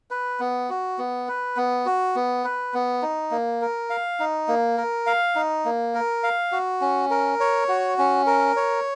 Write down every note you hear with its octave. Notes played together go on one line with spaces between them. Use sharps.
B4
B3
F#4
B3
B4
B3
F#4
B3
B4
B3
D#4
A#3
A#4
F5
D#4
A#3
A#4
F5
D#4
A#3
A#4
F5
F#4
C#4
A#4
C#5
F#4
C#4
A#4
C#5